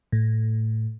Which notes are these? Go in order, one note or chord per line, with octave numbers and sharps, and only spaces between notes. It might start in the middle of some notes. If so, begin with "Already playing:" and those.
A2